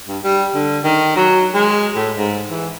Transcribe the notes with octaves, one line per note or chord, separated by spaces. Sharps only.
G2
G3
D3
D#3
F#3
G#3
A2
G#2
E3